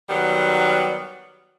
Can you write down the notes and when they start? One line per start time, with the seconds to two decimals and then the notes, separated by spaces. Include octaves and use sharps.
0.10 D#3 F#3 G3 B3